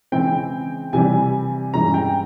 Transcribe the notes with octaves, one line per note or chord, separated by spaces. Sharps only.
C#3 E3 G#3 C4 G5
C3 E3 G3 G#5
G2 E3 G#3 C#4 A#5
G5